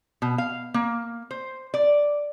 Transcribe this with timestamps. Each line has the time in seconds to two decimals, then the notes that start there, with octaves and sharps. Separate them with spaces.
0.22 B2
0.38 F5
0.74 A#3
1.31 C5
1.74 D5